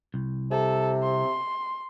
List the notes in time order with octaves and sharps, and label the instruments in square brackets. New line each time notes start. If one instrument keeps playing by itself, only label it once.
[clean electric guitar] C2
[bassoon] C3 [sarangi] A4
[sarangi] C6